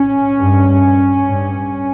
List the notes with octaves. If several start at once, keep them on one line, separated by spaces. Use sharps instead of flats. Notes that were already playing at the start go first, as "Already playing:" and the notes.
Already playing: C#4
G2
G2